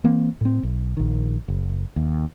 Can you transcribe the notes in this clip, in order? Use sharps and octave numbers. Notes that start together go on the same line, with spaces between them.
E3 A#3 C4
A2 C4
B1
A#1 D#3
F#1
D#2